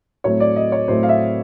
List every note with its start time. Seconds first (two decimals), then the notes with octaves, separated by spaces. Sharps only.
0.24 A2 F#3 A3 C4 C#5
0.40 D5
0.56 D#5
0.72 C#5
0.88 A2 F#3 A3 C4 C5
1.03 F5
1.09 E5